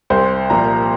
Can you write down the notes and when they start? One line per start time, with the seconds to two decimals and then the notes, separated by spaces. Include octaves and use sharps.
0.10 C2 C5
0.50 A#2 F3 A#3 A#5